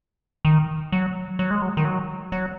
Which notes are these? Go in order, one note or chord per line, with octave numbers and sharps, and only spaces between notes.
D#3
F#3
F#3
G#3
F#3
D#3
F#3
F#3